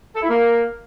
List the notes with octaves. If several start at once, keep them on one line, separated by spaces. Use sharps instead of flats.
A4
E4
A#3